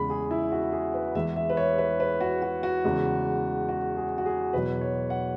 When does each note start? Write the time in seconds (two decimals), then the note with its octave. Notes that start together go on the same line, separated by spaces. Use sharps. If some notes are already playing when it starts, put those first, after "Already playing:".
Already playing: E2 C#3 G#3 B5
0.10 G#4
0.31 E4
0.52 F#4
0.72 G#4
0.94 B4
1.15 E2 E3 G#3 E5
1.36 E5
1.50 B4
1.57 C#5
1.78 B4
2.00 B4
2.21 F#4
2.42 F#4
2.63 F#4
2.84 E2 C#3 G#3
3.69 F#4
3.97 G#4
4.18 F#4
4.26 G#4
4.53 E2 B2 F#3 B4
4.81 C#5
5.10 F#5